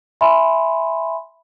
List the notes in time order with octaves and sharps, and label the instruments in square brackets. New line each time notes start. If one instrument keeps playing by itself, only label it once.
[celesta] E5 G#5 B5 C6